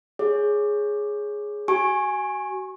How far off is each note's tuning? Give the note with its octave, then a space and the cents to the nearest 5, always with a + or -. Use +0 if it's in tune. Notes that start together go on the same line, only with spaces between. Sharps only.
G#4 +0 C#5 +0
F#4 +30 G#5 +0 C#6 -25